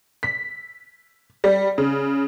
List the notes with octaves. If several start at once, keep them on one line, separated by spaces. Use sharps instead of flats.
B6
G3
C#3